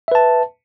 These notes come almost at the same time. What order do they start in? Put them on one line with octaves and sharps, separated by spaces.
E5 B4 A5